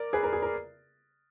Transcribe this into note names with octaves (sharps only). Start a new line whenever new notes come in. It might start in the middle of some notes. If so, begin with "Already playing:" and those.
Already playing: A#4 D5
G#4 B4
A#4
G#4
A#4